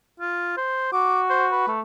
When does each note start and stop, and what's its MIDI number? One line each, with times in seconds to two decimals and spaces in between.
0.20 0.53 65
0.57 0.91 72
0.93 1.63 66
0.93 1.21 86
1.30 1.46 72
1.52 1.71 71
1.68 1.81 57